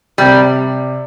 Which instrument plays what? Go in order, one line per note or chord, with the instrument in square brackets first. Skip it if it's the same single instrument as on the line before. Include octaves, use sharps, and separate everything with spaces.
[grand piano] C3 [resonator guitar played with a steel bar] G3